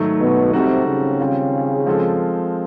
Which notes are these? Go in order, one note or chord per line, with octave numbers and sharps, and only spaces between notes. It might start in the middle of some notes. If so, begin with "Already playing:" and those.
Already playing: G#2 D#3 F#3 A3
B2
C3 G3 C4 D#4 F#4 A4
C#3
D#3 G3 C4 F4
F3 G#3 C4 F4 A4